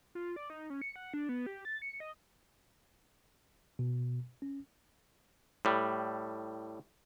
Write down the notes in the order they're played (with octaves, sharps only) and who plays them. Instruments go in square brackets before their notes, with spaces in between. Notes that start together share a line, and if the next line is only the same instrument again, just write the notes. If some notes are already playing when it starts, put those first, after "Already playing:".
[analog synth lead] F4
D5
D#4
C#4
C#7
F#5
D4
B3
G4
A6
C#7
D#5
[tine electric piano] B2
C#4
[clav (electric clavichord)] A2 G3